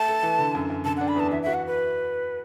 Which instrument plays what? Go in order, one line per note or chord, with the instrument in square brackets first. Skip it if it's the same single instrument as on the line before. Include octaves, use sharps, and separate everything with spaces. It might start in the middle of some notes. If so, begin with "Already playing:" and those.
Already playing: [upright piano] A3 [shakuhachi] A5
[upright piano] A4
E3
D3
F#2
F#2
[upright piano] D3 [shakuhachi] A5
[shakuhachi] F#5
[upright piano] D4
[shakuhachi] B5
[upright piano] E2 [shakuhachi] A5
[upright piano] E3 [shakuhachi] E5
[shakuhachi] E5
[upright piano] F#4
[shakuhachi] F#5
B4